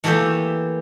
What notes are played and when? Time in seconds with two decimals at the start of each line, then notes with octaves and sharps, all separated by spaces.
0.04 E3 A3 A#3 G4 A4 E5